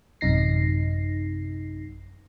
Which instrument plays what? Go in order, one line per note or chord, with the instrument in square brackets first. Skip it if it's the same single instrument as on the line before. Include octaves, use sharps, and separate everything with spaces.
[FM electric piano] A1 F#2 C3 D#4 A#6 C7